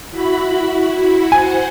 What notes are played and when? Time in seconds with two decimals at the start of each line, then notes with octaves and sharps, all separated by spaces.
0.11 E4 F#4 B5
1.32 C5 F#5 G#5